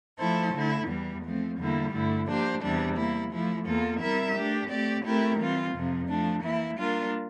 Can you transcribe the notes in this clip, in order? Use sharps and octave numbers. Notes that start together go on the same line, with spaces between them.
F3 A3 E4 A4 C5
D3 A3 E4
E2 E3 G3
F3 A3 C4
E2 D3 G3 A#3 E4
G2 D3 A3 E4
F3 A#3 D4 G4 C5
E2 C3 E3 G3 D4
G3 A#3 E4
F3 A3 E4
E2 E3 A#3 F4 A4
G3 C4 E4 A#4 E5
A3 D4 G4
A3 C4 G4 D5
A3 C4 E4 G4 A#4
E3 G3 C4 F4
F2 C3 F3
F3 A3 D4
E3 A#3 E4
G3 A#3 D4 F4 A#4